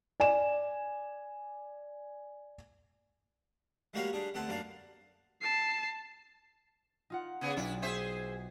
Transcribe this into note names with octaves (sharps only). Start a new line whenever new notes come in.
D5 G#5 E7
G3 G#3 A#3 F#4 C#5 F5
G3 D4 G#4
D2 B3 C4 F#5 A5
F#2 A#3 D4 D5 F5
A5 C7
D#4 F4 F#5
C#3 B3 G#4
B1 D4 E4
G#4 C5 E5